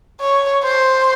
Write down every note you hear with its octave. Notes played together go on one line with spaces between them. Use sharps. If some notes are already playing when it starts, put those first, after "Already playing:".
C#5
C5